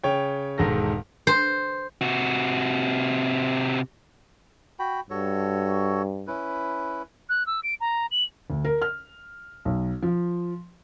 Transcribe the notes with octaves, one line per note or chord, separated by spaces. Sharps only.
C#3 C#5 G5
E1 G#2 D#3 A4 A#6
C5
C3 F#4
F#4 G5 B5
G2 F#4 A4 C#5
C#4 E4 B4
F#6
E6
D7
A#5
F#7
D2
A#4
F6
B1
F3